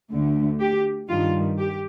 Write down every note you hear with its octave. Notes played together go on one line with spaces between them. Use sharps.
D2 D3 A3
G4
G2 D#3 G3 F4
G4